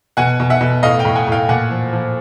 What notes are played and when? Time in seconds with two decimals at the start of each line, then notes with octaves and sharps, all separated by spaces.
0.17 B2 F#5 G#5
0.40 B2
0.50 E5 F#5
0.61 B2
0.83 A2 D#5 F5
0.99 F5 G5
1.05 A2
1.15 F#5 G#5
1.27 A2 F5 G5
1.49 A#2 F#5 G#5
1.71 F3
1.93 F3